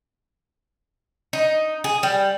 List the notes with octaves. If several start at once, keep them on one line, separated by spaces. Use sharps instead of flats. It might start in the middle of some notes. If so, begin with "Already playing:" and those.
D#4
G#4
G3